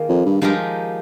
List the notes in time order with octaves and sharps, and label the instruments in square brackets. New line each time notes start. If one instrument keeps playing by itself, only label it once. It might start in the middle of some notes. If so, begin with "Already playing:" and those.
Already playing: [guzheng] D#3 A#3 F4 G#4
[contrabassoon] F2
G2
[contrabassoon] G2 [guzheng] F3 G#3 D#4 G4 A#4